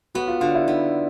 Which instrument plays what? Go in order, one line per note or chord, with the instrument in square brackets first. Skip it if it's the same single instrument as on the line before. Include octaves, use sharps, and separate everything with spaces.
[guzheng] B3 [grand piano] F#4
[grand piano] F4
[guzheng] D3 [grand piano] F4
[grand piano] E4
[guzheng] B3 [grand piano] D#4